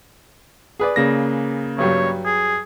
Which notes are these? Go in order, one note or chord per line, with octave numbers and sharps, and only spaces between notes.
G#4 B4 D5
C#3 A#3 A#6
G2 F#3 G3 C#5
G#4